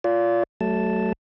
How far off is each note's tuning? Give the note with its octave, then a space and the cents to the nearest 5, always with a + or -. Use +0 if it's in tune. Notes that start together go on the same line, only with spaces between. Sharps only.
F4 +0 D5 -35
F#3 +35 A3 +0 A5 +0